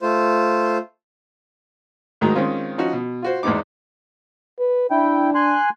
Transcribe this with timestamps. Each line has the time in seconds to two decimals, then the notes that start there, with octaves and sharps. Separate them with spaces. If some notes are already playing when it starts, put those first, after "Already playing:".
0.01 A3 F4 C5
2.21 D2 G#2 D#3 F#3 G#3 A#5
2.35 D#3 G#3 C4 C#4 F4
2.78 F3 C#4 D#4 F#4
2.93 B2
3.22 F4 F#4 C5
3.43 E2 G#2 G#3 B3 D#4 D6
4.59 B4
4.91 D4 E4 G5
5.35 G#5 C6 F#6